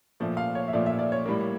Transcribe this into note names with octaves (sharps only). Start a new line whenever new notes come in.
A#2 F3 A3
F5
C#5
E5
A#2 F3 A3 D5
E5
D5
C#5
A2 G3 A#3